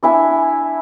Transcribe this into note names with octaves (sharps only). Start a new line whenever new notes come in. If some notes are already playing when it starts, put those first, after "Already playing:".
D4 E4 G#5